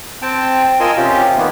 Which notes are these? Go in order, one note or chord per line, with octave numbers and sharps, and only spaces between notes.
C4 G5 A5
F4 A#4 D#5 G#5 C6 E6
C3 C#4 F4 G4
D#3 A#3 B3